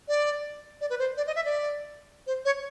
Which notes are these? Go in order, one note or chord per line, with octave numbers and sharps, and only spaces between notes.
D5
D5
B4
C5
D5
D#5
E5
D5
C5
C#5